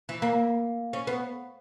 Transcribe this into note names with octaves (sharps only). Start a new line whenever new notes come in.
E3
A#3
C#4
B3